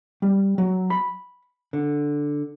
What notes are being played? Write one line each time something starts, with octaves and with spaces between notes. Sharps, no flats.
G3
F#3
B5
D3